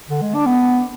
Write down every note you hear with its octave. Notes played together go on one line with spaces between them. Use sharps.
D3
G#3
D4
B3